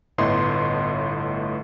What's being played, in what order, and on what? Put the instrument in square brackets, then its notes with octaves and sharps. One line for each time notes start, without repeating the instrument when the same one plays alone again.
[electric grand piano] G1 A2 A3 B3 D#5 C6